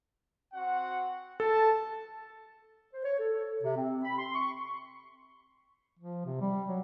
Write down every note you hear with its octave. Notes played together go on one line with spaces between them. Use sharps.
C4 F#4 F#5
A4 A5
C5
C#5
A4
C3
C4
B5
C6
C#6
F3
C3
G3
F#3